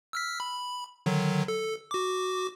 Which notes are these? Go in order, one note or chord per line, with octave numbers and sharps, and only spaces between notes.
E6 F6 B6
B5
D3 D#3 F#3
A4
F#4 D6